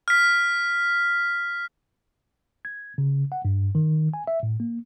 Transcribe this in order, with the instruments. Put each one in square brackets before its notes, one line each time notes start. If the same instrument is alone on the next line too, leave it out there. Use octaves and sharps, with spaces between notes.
[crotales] F6 B6
[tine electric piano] G#6
C#3
F#5
G2
D#3
G#5
E5
A2
A#3